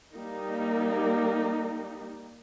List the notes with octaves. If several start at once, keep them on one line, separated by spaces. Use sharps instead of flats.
G3 A#3 D#4